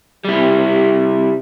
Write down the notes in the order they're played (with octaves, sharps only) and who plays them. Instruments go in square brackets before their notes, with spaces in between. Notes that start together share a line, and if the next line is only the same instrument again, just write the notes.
[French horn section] C3 G4 [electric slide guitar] G3 E4